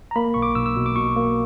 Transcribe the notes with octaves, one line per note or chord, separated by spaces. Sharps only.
A#5
A#3 B5
B1 C#6
D6
B1 E6
E6
B2
D6
B2 C#6
A#3